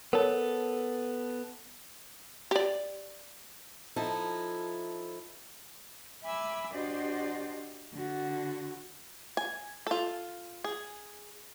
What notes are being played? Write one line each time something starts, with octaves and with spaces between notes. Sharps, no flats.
B3 A4 A#4 C#5
G4 D5
F3 D#4 E4 A4
E5 G#5 B5 D6 E6
D4 F#4 G4 C5 D5 D#5
D3 F#4
G#5
F4 A4
G#4